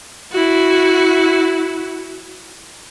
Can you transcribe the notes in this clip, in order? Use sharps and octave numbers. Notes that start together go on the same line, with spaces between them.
E4 F#4